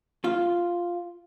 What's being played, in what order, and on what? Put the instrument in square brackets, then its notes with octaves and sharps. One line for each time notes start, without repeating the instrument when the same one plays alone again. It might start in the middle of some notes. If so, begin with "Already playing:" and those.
[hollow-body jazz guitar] F4